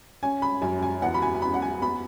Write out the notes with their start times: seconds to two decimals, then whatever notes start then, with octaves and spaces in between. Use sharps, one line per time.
0.23 C#4 G#5
0.42 B5
0.62 F#2 G#5
0.82 G#5
1.02 E2 F#5
1.14 B5
1.22 G#5
1.35 G#5
1.42 E2 B5
1.54 F#5
1.62 G#5
1.82 B3 B5